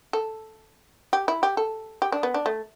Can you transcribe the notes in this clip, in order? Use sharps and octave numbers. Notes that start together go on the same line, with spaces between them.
A4
G4
E4
G4
A4
G4
D4
B3
D4
A3